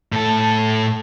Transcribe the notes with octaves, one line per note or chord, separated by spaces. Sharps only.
A2 A4